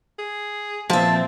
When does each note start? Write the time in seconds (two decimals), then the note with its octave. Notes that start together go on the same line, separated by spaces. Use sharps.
0.19 G#4
0.90 A#2 F3 C4 E5 A5